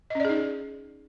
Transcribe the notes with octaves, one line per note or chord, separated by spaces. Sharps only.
C#4 D#4 G#4 D5 D#5